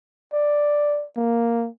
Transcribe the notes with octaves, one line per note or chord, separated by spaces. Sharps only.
D5
A#3